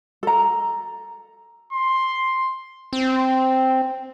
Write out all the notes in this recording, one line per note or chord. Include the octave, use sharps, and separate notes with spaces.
A4 A#5
C6
C4